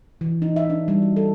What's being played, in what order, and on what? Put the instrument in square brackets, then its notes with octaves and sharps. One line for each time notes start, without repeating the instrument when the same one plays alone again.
[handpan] E3
D#4
E5
D4
G3
F#4
A4